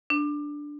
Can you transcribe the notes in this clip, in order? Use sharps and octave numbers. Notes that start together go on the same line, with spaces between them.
D4